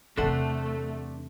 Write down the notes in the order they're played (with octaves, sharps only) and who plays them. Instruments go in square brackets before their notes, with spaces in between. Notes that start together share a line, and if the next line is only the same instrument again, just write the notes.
[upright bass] E2 C3 [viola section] A3 [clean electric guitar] D4 B4 C5 [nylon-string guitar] A4 F#5